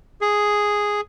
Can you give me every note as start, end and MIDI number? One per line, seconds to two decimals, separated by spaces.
0.21 1.01 68